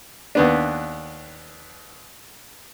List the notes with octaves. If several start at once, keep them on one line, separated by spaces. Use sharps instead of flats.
D#2 B3 D4